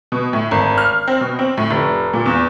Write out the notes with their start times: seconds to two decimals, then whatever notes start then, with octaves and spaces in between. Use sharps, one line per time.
0.12 B2
0.33 A2
0.51 G#1
0.78 F6
1.08 C4
1.21 B2
1.39 C4
1.57 A2
1.71 F1
2.13 A#2
2.26 E2